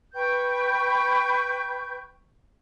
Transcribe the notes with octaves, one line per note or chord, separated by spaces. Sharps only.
B4 G5 C#6 G6